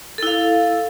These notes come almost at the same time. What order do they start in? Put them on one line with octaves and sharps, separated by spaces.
A4 E4 F5